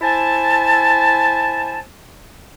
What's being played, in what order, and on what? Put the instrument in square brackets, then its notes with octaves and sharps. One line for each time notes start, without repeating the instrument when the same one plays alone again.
[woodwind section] E4 C5 G#5 A5